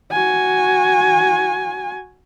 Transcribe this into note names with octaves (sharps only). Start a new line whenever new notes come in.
F#4 G#5